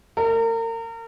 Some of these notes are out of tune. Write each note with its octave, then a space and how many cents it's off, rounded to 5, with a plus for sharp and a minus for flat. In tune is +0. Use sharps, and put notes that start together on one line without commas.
A#4 -35